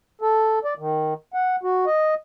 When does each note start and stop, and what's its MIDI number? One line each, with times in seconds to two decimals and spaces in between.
0.21 0.59 69
0.65 0.74 74
0.78 1.14 51
1.34 1.56 78
1.63 1.85 66
1.86 2.14 75